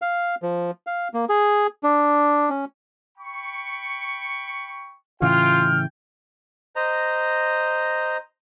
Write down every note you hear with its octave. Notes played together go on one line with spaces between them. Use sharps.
F5
F3
F5
A#3
G#4
D4
C#4
G5 B5 C#6
A2 C#3 E3 F4 G5 F6
C5 D#5 A#5